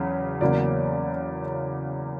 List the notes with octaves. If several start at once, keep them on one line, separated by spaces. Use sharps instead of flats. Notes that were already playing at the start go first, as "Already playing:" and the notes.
Already playing: E2 C#3 F#3
E2 C#3 F#3 A#3 D5